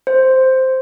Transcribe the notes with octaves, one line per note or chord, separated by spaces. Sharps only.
C5